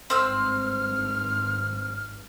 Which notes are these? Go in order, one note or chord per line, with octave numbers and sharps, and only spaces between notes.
G#1 G2 C4 E6 F6